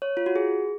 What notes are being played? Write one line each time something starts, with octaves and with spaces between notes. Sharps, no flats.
C#5
F4
F#4
G#4